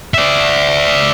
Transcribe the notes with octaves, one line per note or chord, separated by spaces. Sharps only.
D5 E5